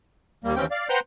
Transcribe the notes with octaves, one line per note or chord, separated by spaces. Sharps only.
D#2 G3 A#3
D#2 E3 C4 C#4 G5
D5 F5
B4 C5 F#5 G5 A#5 C6